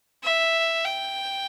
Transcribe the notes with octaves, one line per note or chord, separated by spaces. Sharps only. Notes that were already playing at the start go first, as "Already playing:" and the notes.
E5
G5